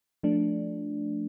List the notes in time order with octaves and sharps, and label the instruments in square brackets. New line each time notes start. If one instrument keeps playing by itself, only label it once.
[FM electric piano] F3 A3 D4